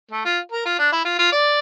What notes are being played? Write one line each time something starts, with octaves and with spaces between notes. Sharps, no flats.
A3
F4
A#4
F4
D4
E4
F4
F4
D5